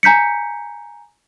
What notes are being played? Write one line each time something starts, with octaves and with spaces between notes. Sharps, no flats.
G#5 A#5 G6 B6 C#7